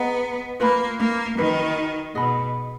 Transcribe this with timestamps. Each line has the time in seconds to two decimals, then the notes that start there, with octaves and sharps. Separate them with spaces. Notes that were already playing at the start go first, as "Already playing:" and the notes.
Already playing: B3 G#4 D#5 F#5 A#5
0.60 A#3 F4 B4 F#5 B5
0.99 A#3
1.37 D#3 D#4 F#4 B4
2.14 B2 G#4 D#5 F#5 B5